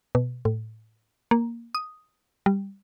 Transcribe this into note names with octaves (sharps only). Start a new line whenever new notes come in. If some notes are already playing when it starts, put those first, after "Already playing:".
B2
A2
A#3
D#6
G3